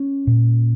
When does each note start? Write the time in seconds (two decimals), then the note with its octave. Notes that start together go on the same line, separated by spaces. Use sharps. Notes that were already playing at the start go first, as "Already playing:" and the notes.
Already playing: C#4
0.27 A#2